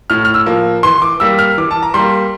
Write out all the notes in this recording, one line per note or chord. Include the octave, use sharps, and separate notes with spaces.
A2 F6
F6
E6
F3 A#3
E3 C6
D6
G3 A#3 E6
F6
E3 D6
A5
A#5
G3 C6
A#3